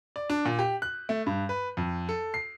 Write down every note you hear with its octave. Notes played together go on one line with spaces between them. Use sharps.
D5
D4
A#2
G4
F#6
A3
G2
B4
F2
A4
C7